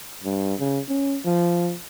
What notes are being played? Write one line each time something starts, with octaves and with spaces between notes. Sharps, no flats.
G2
C#3
C#4
F3